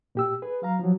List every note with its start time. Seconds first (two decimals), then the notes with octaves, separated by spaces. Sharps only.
0.15 A#2 G4 E6
0.42 G#4 B4
0.62 F#3 F5 A#5
0.79 F3 F#3